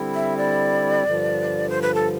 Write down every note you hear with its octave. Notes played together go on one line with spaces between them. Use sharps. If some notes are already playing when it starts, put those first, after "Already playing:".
Already playing: D3 G3 C4 E4
E5
D5
G2 D3 F3
C5
B4
A4